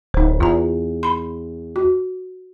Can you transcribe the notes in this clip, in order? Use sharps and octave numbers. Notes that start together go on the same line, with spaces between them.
D1 D#4 C5
E2 F4 A#5
B5 C6
F#4